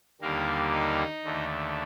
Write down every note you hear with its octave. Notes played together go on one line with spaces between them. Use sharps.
D#2 D3 G3 A#3 A#4
D#4 D#5
D#2 D3 A3